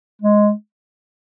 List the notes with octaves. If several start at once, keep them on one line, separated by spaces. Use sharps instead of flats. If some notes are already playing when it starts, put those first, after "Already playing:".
G#3